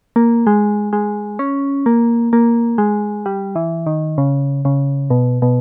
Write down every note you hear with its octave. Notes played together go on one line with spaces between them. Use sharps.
A#3
G#3
G#3
C#4
A#3
A#3
G#3
G3
E3
D#3
C#3
C#3
B2
B2